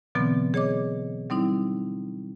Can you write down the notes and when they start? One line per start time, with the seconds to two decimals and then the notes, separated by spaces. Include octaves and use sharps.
0.15 B2 D3 E3 F#3 B3 C4
0.54 G#4 C#5 D#5 D6
1.30 G3 C4 D#4 E4